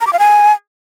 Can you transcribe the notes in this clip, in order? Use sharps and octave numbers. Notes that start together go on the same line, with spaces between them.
A#5
D6
F5
G#5